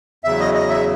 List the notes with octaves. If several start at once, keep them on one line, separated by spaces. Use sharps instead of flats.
E2 C#3 F#3 E5
D#5
D#5
E5